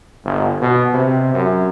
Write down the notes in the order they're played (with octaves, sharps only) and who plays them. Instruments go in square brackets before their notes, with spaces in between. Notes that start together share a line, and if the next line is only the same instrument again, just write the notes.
[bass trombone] G1
B2
C3
F#2